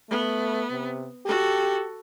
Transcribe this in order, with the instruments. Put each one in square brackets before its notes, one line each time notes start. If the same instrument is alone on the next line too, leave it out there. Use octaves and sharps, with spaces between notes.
[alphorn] A3 [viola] B3
[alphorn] C3
[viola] F#4 A4 [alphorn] G4